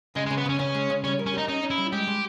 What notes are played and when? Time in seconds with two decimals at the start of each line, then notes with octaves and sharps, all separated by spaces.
0.15 C#3 G#3
0.26 G#3
0.30 C#3
0.38 B3
0.46 C#3 C#4
0.59 C#3 C#4
0.75 G#3
0.90 C#3
1.04 G3 C#4
1.19 A#4
1.26 C#4
1.34 D#4 G4
1.48 C#4 D#4
1.63 C#4
1.70 E4
1.78 G3
1.93 G#3 G4
2.07 G#3